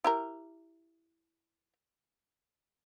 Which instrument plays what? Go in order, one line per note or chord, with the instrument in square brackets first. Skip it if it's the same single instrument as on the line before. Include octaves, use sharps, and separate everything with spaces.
[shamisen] E4 G4 A#4